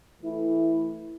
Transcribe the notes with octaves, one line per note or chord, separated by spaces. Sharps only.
E3 A3 E4